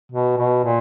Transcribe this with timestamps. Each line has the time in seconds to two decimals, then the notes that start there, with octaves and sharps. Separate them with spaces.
0.12 B2
0.37 B2
0.65 A#2